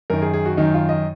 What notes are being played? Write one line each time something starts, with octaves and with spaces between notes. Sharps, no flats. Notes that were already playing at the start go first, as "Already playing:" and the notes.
F#2 D#3 A#4
G#4
G#4
F#4
F#2 D#3 D#4
F4
D#5